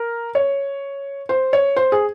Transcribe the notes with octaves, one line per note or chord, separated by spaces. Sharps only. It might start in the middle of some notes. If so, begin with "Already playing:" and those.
Already playing: A#4
C#5
C5
C#5
C5
G#4